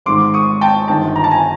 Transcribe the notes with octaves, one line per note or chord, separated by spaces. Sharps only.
G#1 G#2 D#3 C6 D6
C#6 D#6
G5 A5
G1 G2 D#3 G5 A5
A#5
A5
G#5 A#5